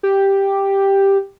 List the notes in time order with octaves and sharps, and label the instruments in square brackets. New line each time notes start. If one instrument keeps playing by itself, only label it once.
[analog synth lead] G4